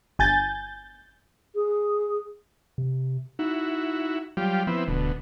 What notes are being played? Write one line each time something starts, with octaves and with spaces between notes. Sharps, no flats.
G1 G#5 G6 A6
G#4
C3
D#4 E4 F#4
F#3 G3 F4 G4
F3 B3 C4 E4
D1 D2 B2